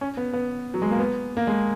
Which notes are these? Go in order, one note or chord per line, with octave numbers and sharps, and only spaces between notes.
C#4
B3
B3
F#3
G#3
A#3
B3
A#3
G#3